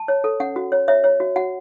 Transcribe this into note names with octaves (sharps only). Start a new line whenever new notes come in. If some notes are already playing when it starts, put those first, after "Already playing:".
Already playing: A5
C#5
A4
C#4 F#5
F#4
C#5
C#5 E5
C#5
F#4
F#4 F#5